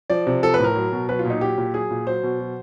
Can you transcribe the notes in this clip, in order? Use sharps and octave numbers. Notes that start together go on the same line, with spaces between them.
F3 D5
C3
F3 A4
B4
A2 A#4
F#3
B2
F#3 B4
F4
A#2
D#4
F#3 G4
A#2
F#3 G#4
A#2
F#3 C5
B2
F#3